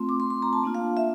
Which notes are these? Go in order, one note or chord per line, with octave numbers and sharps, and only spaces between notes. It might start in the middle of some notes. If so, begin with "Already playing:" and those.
Already playing: A3 C4 F4 C6
D6
C6
C6
A#5
A5
A#3 D4 F4
F5
E5